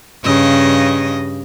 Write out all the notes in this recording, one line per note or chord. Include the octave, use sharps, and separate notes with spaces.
G2 C#3 D#5